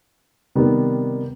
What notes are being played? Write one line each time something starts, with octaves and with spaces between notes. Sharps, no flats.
C3 D#3 G3 B3